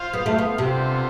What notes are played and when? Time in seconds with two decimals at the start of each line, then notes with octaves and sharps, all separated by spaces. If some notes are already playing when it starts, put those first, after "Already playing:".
Already playing: F4 C5 F5
0.13 B3
0.26 A3
0.38 B3
0.58 C3 B3 D4 F4 A4 C5